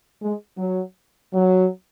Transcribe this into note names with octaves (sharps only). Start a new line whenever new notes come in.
G#3
F#3
F#3